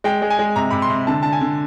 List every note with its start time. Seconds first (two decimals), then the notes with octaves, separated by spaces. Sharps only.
0.04 G#3 G5
0.22 G#3
0.30 G#5
0.39 G#3
0.56 C3 A#5
0.71 C3 B5
0.82 C6
0.90 C3
1.07 D3 A5
1.23 D3 A5
1.33 G#5
1.41 D3